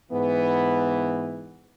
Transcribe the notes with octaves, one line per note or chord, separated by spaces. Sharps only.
G#2 E3 B3